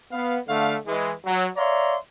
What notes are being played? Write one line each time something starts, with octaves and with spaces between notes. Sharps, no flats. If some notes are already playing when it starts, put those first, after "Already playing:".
B3 F5
D3 A3 F5
E3 G#3
F#3
C#5 D5 E5 F5 A#5 C6